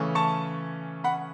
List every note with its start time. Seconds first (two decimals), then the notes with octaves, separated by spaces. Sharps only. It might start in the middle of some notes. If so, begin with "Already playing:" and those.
Already playing: C#3 E3 A3 C#4
0.15 A5 C#6
1.04 F#5 B5